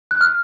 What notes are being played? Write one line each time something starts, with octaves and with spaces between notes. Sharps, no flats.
F#6
F6